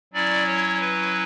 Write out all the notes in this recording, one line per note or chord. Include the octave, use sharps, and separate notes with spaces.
F#3 C#4 E4 D5
C#5
B4